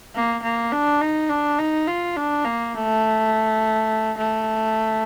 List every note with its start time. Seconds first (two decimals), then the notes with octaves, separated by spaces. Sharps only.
0.15 A#3
0.43 A#3
0.72 D4
1.01 D#4
1.29 D4
1.59 D#4
1.87 F4
2.17 D4
2.45 A#3
2.74 A3
4.18 A3